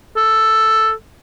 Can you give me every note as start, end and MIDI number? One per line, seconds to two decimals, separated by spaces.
0.16 0.92 69